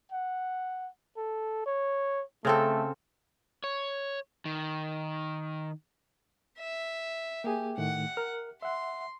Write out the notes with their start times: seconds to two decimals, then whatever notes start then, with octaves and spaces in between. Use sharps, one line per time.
0.12 F#5
1.17 A4
1.66 C#5
2.45 C#3 A3 C4 A4
3.64 C#5
4.45 D#3
6.59 E5
7.44 A#3 G4 G#4 G#5
7.78 A2 D#3 A3 F#5
8.17 A#4 F6
8.62 E5 F#5 C6